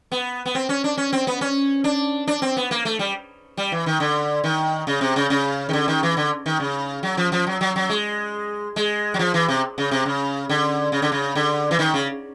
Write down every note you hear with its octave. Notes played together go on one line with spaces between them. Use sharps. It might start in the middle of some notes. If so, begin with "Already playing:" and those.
B3
B3
C4
C#4
D4
C#4
C4
B3
C#4
D4
D4
C4
B3
A#3
A3
G3
G3
E3
D#3
D3
D#3
C#3
C3
C#3
C#3
D#3
D3
D#3
E3
D3
D#3
C#3
F#3
F3
F3
F#3
F#3
F#3
G#3
G#3
F#3
F3
E3
C3
C#3
C3
C#3
D3
C#3
D3
C#3
D3
E3
D#3
C#3